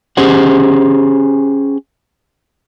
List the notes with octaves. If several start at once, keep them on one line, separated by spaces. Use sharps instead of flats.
C#4 G4 G#4 C5 F#5